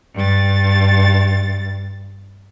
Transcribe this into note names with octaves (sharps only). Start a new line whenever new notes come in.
G2 A6